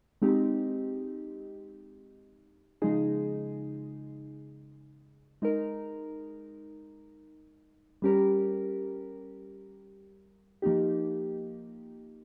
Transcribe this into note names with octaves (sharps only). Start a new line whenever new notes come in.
G#3 C4 D#4 G4
C#3 F3 G#3 D#4 G#4
G#3 D#4 A#4
G3 C#4 G4 A#4
F3 A#3 D#4 G4